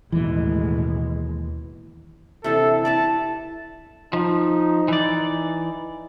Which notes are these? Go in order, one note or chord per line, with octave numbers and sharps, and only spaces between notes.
A1 D#2 B2 E3 G#3
C3 E3 D4 A4
E4 B4 D5 A5
F3 D#4
E3 D5